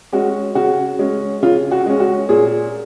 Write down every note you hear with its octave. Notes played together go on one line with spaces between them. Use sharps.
G#3 C#4 F#4
C#3 F#4
G#3 C#4
C#3 F4
F#4
G#3 C#4
F#4
A#2 G#4